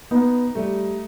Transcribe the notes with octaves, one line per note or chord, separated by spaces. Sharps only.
B3 D#4
G3 A3